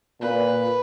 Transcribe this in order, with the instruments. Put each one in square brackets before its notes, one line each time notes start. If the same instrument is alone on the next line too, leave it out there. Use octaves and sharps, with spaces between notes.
[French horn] A#2 [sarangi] B4